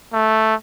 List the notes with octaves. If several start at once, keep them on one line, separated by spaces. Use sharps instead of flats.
A3